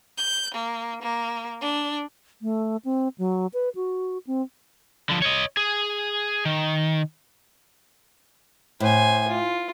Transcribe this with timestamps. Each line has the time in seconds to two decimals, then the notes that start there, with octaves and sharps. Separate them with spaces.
0.18 G6
0.55 A#3
1.03 A#3
1.61 D4
2.42 A3
2.85 C4
3.18 F#3
3.54 B4
3.75 F#4
4.27 C4
5.09 D3 F3
5.22 C#5 D#5
5.57 G#4
6.45 D#3
8.80 A2 C5 G#5
9.28 F4